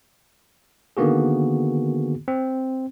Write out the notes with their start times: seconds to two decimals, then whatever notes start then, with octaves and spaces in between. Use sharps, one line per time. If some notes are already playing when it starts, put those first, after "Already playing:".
0.97 D3 D#3 A#3 B3 F#4 G#4
2.28 C4